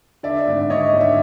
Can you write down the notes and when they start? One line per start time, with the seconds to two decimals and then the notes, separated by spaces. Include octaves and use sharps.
0.23 D3 D5 E5
0.47 G#1
0.70 D3 C#5 D#5
0.93 G#1
1.01 D5 E5